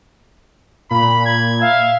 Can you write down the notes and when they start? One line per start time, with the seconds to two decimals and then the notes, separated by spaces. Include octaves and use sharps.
0.91 A#2 B5
1.26 G#6
1.61 E5 F5